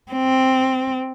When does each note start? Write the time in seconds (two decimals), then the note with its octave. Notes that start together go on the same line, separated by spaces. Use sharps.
0.12 C4